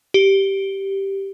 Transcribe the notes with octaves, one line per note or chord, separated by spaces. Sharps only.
G4